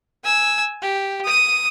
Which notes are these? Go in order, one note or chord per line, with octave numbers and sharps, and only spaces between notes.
G#5 E6
G4
D#6 D#7